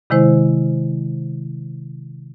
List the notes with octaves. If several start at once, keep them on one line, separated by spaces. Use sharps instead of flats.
C3 D#3 G#3 E4 C5